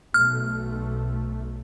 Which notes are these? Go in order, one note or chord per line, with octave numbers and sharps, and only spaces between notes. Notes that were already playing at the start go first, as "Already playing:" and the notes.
B1 A3 F6